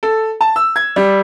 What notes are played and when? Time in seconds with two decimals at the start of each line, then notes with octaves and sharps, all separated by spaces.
0.03 A4
0.41 A5
0.56 E6
0.76 G#6
0.96 G3